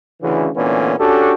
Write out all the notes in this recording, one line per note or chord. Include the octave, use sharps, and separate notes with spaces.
D2 C#3 E3
D2 A#2 D3 E3 B3 C#4
C#4 D4 F#4 G4 A4